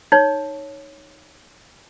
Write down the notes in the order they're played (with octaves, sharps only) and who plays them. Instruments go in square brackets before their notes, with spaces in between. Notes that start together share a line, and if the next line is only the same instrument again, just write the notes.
[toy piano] D#4 C#5